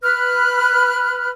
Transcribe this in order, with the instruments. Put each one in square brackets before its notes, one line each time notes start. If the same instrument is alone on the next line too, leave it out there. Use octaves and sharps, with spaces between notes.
[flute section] B4 B5 F6 F#6